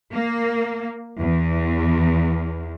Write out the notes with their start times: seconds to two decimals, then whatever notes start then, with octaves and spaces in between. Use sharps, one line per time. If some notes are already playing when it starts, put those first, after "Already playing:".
0.11 A#3
1.19 E2